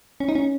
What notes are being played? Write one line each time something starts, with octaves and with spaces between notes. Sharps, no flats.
C#4
D#4
C#4